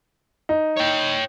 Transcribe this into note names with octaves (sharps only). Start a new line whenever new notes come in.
D#4
C#5 G5